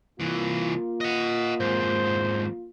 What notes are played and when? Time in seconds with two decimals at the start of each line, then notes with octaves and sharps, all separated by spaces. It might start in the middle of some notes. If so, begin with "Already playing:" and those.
0.20 C2 E3 A#3 F4
1.01 D#5 F#5
1.60 F2 G#2 C5